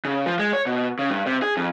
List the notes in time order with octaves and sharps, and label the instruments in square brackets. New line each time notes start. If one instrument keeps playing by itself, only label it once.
[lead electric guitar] C#3
F3
G#3
C#5
B2
C#3
G2
C3
G#4
F2